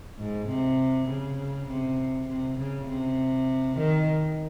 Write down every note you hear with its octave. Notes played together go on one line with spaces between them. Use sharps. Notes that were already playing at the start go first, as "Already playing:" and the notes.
G#2
C3
C#3
C3
C3
C#3
C3
D#3